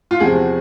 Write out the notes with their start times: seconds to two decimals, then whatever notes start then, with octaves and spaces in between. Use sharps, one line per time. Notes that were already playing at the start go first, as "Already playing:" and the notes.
0.11 F4
0.20 E2 C3 F3 G#4